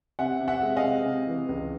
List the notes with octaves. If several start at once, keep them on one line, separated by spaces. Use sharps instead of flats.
C3 E5 F#5
C3
E5 F#5
G#3
D#5 F5
C3
C3
E3
C#2